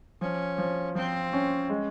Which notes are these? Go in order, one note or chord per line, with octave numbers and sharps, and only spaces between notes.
F3 C#4
F3
F3 C4
C#4
G#3